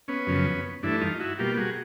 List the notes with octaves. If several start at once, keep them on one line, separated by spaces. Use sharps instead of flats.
B3 C#4
F#2 C#3 F3
G2 E3 A3 D4 E4
D#4 F4
E4 F#4
B2 G3 A#3 F4 G4
F#4 G#4